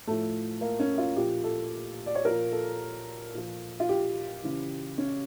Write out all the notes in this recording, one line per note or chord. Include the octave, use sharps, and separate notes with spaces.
A2 F3 A3
A#3
C#4
F4
A#2 F3 G4
A4
D5
C#5
A#2 F3 A#4
A4
A#2 F3
F4
G4
C#3 E3
C#4